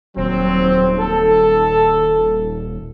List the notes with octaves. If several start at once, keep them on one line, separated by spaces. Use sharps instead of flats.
D#1 F#3 C4
A4